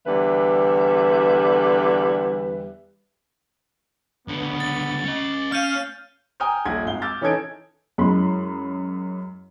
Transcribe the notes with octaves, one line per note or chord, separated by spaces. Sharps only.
E2 D3 G3 B4 E5
C#2 D3 B3
A6
C#4 D#5
C#4 F5 F6 G6 D#7
G5 G#5 A#5 D#6 F6 G6
D#1 A#1 F4 F#5 G#6
G#1 G#2 F5 G7
D6 E6 F6 G6 A6
E3 C#4 D#4 A4 G#6 D7
F#2 G#3 E4 B5 C6